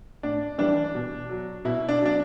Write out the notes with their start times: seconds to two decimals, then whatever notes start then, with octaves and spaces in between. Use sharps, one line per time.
0.23 A2 D4
0.58 E3 G3 D4
0.95 B2
1.29 F#3
1.65 B2 E4
1.89 D4
2.01 F#3 D4